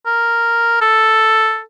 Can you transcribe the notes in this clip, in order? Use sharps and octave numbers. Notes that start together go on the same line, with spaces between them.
A#4
A4